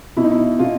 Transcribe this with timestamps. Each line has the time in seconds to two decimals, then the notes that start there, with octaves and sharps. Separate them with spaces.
0.17 B2 E4
0.24 D#4
0.32 E4
0.59 B2 F4